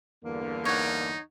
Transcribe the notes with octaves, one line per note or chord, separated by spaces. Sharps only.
E2 G2 D3 A#3
D#4 C#5 F#5